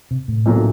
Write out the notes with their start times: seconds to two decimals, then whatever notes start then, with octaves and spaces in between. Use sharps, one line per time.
0.11 C3
0.28 A2
0.46 C2 A#2 F#3 A3 D4